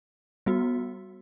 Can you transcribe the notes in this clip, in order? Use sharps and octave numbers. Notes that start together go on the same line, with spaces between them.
G3 B3 F#4